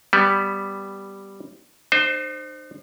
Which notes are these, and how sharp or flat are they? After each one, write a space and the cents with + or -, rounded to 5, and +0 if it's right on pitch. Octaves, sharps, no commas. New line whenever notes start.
G3 +0 B3 +0
D#4 -45 C5 +5